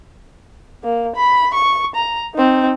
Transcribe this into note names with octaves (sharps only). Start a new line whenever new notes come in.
A#3
B5
C#6
A#5
C4 D#4